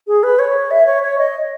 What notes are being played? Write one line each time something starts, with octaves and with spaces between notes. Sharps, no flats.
G#4
B4
C#5
E5
C#5
C#5
D#5